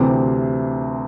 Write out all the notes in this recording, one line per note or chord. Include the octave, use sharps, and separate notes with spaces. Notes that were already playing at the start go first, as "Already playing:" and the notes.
Already playing: D2 C3 E3 C4 G4